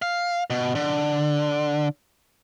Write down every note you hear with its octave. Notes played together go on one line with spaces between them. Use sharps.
F5
B2
D3